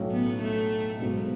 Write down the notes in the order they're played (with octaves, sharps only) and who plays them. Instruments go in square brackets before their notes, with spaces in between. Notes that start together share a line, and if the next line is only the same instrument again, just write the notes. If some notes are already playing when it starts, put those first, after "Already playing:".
Already playing: [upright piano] B1 A2 F#3 C#4
[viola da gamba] B3
A3
[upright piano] G#1 G#2 F#3 [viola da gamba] B2